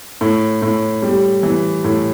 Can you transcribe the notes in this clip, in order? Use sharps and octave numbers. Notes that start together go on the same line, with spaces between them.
A2
A2
G3
E3
A2